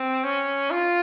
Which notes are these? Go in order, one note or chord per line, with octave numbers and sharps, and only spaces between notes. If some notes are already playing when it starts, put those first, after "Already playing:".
Already playing: C4
C#4
F4